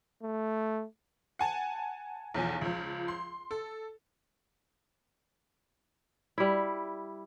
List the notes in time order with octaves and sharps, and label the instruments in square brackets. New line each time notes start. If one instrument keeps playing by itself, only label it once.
[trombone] A3
[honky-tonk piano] F#5 G#5 A5
B1 E2 F3 G#5
C#2 F3
C6
A4
[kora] G3 E4